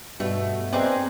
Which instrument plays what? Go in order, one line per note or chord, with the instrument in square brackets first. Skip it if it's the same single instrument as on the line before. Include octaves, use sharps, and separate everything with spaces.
[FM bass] G2 [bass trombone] B2 [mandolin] A3
[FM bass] B3 [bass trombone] C4 [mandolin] D4 D#4 G#4